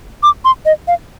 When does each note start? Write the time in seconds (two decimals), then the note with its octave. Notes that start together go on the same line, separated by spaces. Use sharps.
0.23 D6
0.45 C6
0.65 D#5
0.87 F5